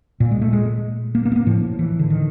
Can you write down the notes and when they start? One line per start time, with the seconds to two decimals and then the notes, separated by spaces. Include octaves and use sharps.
0.20 A#2
0.31 G#3
0.41 A3
0.53 G#3
1.15 A#3
1.25 A#3
1.32 B3
1.36 A#3
1.47 A2 F3
1.79 E3
1.99 D3
2.10 D#3